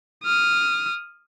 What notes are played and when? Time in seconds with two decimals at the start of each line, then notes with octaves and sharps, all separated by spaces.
0.25 D#6 F6